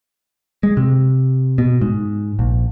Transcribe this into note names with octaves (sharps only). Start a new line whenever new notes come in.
G#3
C3
B2
G#2
A#1